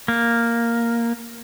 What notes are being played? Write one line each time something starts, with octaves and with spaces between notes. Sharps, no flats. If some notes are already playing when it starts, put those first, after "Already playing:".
A#3